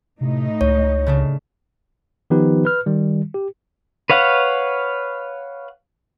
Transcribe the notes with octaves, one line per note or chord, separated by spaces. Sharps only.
A2 C3 D#4
C#2 C#5
C#3 A3 D4
D#3 F3 B3 D#4 G4 B4
B4 F6
D#3 G3
G4
B4 C#5 F5 F#5